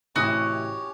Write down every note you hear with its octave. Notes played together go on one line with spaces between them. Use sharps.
A1 C3 C#4 E4 F#4 G4 C#5 D#6